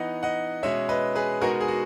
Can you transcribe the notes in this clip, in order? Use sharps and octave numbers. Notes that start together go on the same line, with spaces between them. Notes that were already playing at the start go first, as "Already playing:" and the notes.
Already playing: E3 B3 D#4 D#5 F#5
D#5 F#5
B2 G#3 C#4 C#5 E5
B4 D#5
G#4 B4
B2 G#3 B3 D#4 F#4 A#4
G#4
F#4